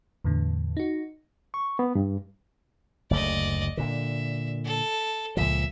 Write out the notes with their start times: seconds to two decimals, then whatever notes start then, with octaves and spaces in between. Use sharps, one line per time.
0.24 E2 A2 D3
0.77 D#4 F#4
1.54 C#6
1.79 B3
1.95 G2
3.11 F#1 D2 A3 D5 D#5
3.77 A#2 D3 E5
4.65 A4
5.37 C#2 A#2 F3 E5